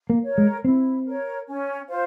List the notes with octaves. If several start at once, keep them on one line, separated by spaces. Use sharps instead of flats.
A#3
A#4 C#5
G#3
C4 E4
A#4 C#5
C#4
F4 C5 F5